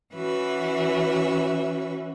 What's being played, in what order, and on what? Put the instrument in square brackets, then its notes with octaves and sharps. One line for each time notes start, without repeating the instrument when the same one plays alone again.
[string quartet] E3 C#4 F#4 B4 E5